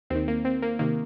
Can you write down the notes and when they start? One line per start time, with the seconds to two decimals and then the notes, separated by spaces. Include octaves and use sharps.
0.10 D#2 D#3 C4
0.28 A#3
0.45 C4
0.62 A#3
0.79 C3 D#3 A#3